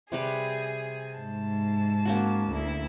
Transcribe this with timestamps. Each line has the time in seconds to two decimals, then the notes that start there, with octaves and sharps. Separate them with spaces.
0.12 C3 G3 G#4 B4
1.18 G#2 A5
2.05 A#3 C#4 F#4
2.48 D2 E4